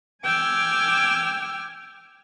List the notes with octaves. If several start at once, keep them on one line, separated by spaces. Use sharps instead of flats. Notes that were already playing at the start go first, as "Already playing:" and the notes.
G5 G#5 D6 E6 F6 G#6